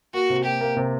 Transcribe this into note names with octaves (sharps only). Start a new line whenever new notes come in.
A#3 F#4
C3
A#3 G4
A#3
C3